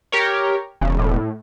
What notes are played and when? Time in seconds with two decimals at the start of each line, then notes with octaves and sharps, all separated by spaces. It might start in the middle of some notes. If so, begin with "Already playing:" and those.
0.12 G4 A#4 C#5
0.81 E1 C#3
0.99 A2